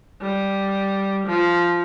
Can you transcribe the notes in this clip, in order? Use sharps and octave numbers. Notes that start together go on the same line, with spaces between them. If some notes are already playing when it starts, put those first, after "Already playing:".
G3
F3